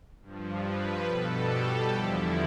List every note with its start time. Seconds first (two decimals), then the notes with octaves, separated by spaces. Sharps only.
0.22 G2 F3
0.65 B4
1.08 B2 G3 A4
1.51 G4
1.93 E2 D3 F3 E4